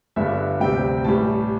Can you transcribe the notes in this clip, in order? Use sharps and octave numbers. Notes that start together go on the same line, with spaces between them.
G1 G2 D3 G3 E5
D2 C3 G3 G5
A1 A2 G3 A5